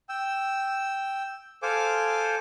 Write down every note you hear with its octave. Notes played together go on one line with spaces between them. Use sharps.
G5 E6
A4 C5 F5 G#5 D6